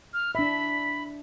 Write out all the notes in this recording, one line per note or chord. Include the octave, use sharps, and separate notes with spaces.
F6
D4 E5 B5